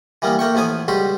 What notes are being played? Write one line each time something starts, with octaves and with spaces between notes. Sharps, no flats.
E3 G3 A#3 B3
A3 A#3 G5 C#6
A1 F3 B3 G#5 D#6
C#2 G3 F#4 G4 C6